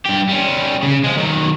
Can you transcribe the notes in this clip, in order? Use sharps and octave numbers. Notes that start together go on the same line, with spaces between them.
G2 G4
G3 C#4
C#3
F3 G#3
D#3 F#3